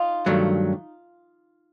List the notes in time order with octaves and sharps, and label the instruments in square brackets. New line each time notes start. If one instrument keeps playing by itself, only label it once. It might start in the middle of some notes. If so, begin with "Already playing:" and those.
Already playing: [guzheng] D#4 F4
[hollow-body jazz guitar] G2 D#3 F#3 A3